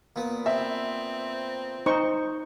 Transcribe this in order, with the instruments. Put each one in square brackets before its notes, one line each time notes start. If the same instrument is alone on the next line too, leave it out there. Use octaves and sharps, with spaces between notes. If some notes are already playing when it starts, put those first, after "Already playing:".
[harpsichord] A#2 B3
[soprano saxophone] C4 [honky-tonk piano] E5
[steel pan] D#4 C5 C#6